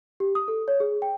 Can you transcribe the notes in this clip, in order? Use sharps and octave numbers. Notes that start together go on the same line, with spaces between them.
G4
D#6
A4
C#5
G#4
G5